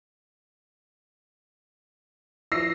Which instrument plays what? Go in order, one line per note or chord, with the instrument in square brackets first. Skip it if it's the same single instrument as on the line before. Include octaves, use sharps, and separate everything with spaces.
[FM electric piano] E3 F3 [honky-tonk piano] E6 A#6 C7